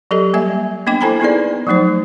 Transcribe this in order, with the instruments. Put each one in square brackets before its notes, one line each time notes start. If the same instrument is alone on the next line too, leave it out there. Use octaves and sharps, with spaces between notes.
[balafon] F#3 G4 A4 D#5
G3 A#3 E5 G#5
A#3 B3 D4 D#5 G5 D6
E4 A4 C5 G#5 A#5 B5
B3 D#4 E4 G#4 B4 D5
F3 F#3 A3 D#4 C5